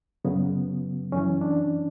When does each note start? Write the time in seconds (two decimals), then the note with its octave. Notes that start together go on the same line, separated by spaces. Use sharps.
0.25 F#2 C#3 F#3 B3
1.12 F#2 E3 C#4
1.41 D4